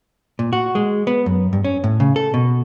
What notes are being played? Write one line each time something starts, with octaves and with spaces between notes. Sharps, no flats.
A#2
F#4
G#3
B3
F#2
G2
C#4
A2
C#3
A4
B2